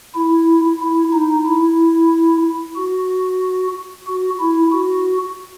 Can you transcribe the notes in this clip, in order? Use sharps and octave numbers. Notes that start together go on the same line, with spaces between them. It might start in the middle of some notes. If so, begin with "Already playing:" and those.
E4
E4
D#4
E4
F#4
F#4
E4
F#4